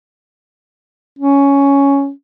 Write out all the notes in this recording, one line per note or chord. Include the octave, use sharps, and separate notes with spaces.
C#4